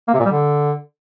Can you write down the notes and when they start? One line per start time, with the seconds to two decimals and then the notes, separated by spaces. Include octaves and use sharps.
0.08 A#3
0.14 C3
0.19 A#2
0.25 G3
0.31 D3